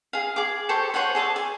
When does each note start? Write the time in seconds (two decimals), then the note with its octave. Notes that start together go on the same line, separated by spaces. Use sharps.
0.13 G#4 F5
0.36 G#4 D6
0.69 G4 A4 C5 C#6
0.94 C5 C#5 F#5 G#5
1.15 G#4 A4 D5 A5
1.36 G#5